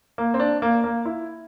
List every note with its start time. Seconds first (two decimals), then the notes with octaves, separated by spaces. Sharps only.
0.18 A#3
0.34 C4
0.40 D4
0.62 A#3
0.84 A#3
1.05 E4